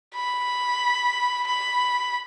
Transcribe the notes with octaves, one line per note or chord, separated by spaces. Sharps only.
B5
B5